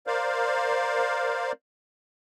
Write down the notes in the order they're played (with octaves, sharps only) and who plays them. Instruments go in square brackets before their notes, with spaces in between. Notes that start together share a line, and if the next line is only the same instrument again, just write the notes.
[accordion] A#4 C5 D5 F5